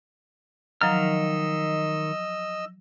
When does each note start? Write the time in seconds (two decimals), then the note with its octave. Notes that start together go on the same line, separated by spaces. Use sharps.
0.81 D#3 F3 F#3 D#5 A#5 E6 F6